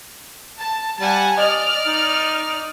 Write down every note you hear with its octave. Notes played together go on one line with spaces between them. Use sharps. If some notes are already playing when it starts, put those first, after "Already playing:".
A5
G3 F#5 G#5 A5
D5 D#5 F6
D#4